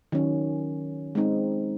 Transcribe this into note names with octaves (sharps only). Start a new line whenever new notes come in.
D#3 F#3 C#4
G#3 C4 D#4